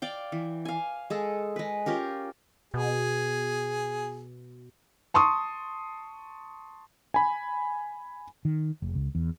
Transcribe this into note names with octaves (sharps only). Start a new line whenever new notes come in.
D5 F5 G5
E3
F5 G#5
G#3 G#4 A4
G#3 B4
C#4 F4 G4 A#4
B2 G#4
A5 C6 C#6 D#6
G#5 B5
D#3
F1
C#2
E2